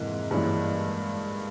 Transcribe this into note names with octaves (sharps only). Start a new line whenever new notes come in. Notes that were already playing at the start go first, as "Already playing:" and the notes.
Already playing: F2 G#2 C3 E3 A#3 E4
G2 A#2 E3 G#3 C#4 E4 G4